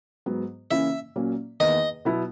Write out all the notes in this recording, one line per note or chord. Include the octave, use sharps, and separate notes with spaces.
G#2 F#3 B3
C#3 E3 A#3 C#4 E4 E5
A#2 F#3 A#3 C#4
E2 D#3 A#3 D#4 D#5
B2 F#3 B3 E4